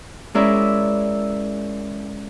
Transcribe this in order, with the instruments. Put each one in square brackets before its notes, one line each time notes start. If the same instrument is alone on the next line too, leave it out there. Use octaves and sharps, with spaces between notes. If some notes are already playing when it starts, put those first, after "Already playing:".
[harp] G#3 C#4 E4 A#4 D5 E5